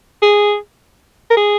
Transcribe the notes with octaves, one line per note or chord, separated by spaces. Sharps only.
G#4
A#4
G#4